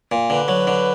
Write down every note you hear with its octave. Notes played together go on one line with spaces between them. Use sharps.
A#2
D3 B4
F#3
D3